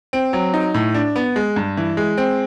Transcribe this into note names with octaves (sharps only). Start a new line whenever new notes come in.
C4
F#3
D#4
A2
D4
B3
G#3
G2
E3
G#3
C4